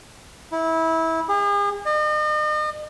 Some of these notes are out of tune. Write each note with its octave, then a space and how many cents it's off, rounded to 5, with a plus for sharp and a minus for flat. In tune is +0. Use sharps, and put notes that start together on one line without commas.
E4 -20
G#4 -40
D#5 -40